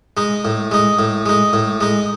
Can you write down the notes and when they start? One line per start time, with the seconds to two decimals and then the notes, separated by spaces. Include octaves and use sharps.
0.17 G#3 D#4
0.45 A2
0.71 G#3 D#4
0.99 A2
1.26 G#3 D#4
1.53 A2
1.81 G#3 D#4